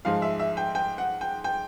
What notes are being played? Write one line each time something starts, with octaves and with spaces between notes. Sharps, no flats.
G#2 F3 G#3 F5
E5
E5
G5
G5
F#5
G5
G5